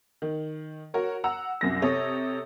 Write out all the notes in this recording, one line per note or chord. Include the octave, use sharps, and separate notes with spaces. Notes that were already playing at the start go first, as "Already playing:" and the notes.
D#3
F#4 A#4 C#5
F#5 A#5 E6
C2 F#2 A#6
C3 A4 C#5 D#6